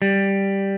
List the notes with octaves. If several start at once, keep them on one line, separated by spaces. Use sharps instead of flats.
G3